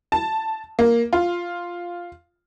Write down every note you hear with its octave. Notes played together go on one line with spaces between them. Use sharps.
A5
A#3
F4